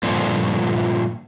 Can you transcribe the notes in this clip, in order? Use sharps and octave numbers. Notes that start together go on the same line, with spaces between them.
G2 A#2 D3 F3